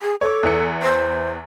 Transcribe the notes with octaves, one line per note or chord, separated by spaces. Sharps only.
G#4
A4 C#5 D6
E2 E3 C#7
C5